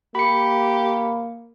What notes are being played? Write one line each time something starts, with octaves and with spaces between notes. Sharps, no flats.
A#3 G4 B5 C#7